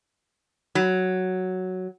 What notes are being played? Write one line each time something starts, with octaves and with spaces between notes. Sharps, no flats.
F#3